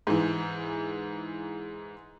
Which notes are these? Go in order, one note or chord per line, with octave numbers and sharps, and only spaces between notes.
G#2 E3